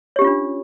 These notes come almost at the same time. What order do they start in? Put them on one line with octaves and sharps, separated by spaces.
C#5 G4 C#4 F4 D4